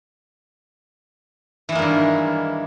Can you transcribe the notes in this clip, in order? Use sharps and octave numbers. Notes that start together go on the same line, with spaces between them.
G2 D#3 E3 G#3 A#3